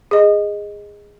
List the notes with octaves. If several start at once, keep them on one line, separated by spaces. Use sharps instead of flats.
G#4 D#5